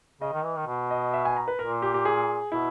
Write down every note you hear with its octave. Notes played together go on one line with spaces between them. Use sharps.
C#3 D#5
D#3
E3
D#3
B2
D#5
E5
G#5
A#5
B4
A#2 A#4
G4
G4
G#4
B2 E4